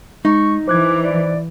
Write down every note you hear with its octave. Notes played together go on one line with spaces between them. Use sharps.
G#3 D#4 C#6
E3 C5 D6 F#6 G#6
D5